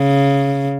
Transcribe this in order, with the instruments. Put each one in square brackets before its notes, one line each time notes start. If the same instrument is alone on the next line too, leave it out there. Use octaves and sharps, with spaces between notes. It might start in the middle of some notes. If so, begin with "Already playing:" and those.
Already playing: [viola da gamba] C#3